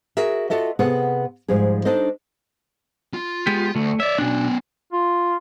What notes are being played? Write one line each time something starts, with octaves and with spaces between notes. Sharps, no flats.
F#4 G#4 A#4 E5
F4 F#4 A4 D#5 E5
C3 B3 G#4 A4 F#5
G#2 F3 G3 G#4
D4 D#4 A4 C5 D#5
F4
G#3 B3 G4
D2 A3
C#5 D5 E5
B2 B3 C#4 D4
F4